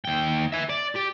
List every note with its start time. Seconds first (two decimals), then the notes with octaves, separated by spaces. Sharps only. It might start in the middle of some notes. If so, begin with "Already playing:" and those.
0.05 D#2 G5
0.53 E5 G#5
0.69 D5
0.95 G4